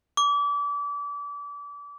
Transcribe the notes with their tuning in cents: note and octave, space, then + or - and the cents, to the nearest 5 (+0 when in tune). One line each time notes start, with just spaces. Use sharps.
D6 -30